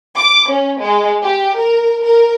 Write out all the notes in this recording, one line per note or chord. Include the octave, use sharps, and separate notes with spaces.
D6
C#4
G#3
G4
A#4
A#4